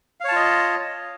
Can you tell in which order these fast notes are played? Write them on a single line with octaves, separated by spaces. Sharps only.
F5 C#5 A5 F4 D#5